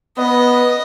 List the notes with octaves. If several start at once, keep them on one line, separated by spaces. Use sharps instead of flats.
B3 D#5